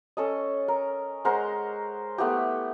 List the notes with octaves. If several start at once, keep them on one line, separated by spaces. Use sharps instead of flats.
C#4 A4 D#5
A#4
G#3 A#4 C5 F#5
A3 B3 E4 G4